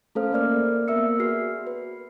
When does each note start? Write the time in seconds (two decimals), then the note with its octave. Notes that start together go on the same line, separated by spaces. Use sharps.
0.15 A3 C#4 A4 C5 F5 F6
0.32 A#3 A#4 D5 F6
0.88 A#3 B3 A#4 E5 E6 C#7
1.20 F#4 G#4 B4 F6 C7
1.67 B4